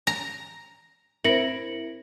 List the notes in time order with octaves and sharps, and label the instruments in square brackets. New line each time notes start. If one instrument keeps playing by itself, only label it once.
[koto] A#5
[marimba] C4 C5 [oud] E4 A#4 [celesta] A#6 C#7 F#7